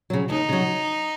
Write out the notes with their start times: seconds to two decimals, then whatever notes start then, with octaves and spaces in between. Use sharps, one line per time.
0.10 C#3 F#3
0.30 D#2 D#4
0.49 C#3 F#3